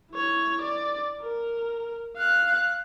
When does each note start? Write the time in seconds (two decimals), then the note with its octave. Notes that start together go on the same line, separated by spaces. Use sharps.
0.12 E4 C#5
0.61 D5
1.21 A#4
2.17 F5 F#6